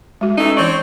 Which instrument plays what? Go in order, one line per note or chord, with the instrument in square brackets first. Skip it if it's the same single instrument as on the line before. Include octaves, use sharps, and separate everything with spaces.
[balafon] G#3 F#4
[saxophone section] E3 A3 D#4 [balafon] C#4
[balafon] E3 C#6 [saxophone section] C4 C#5 D5